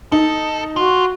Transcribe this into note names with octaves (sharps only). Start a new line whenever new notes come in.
D#4 A4
F4 F#4